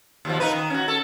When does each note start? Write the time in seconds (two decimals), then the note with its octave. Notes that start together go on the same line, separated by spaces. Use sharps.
0.25 D#2 B2 F3
0.40 D#4 A#4 B4
0.53 D#3
0.70 C#4 F#4
0.88 A4